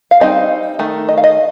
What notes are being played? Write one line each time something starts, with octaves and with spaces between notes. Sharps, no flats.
F5
G3 C4 D#4 D#5
D#3 A3
D#5
F5
D#5